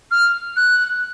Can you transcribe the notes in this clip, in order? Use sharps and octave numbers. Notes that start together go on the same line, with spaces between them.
F6
F#6